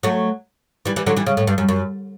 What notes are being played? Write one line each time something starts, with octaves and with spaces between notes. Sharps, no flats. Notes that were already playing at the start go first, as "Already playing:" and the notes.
F#3 A3
E3 G3
E3 G3
D3 F#3
E3 G3
C#3
A2
G2
F#2
F#2